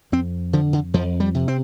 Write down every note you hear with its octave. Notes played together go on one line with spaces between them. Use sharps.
F2 C4
D3 F3
D3
F2 F3
G3
C3
C4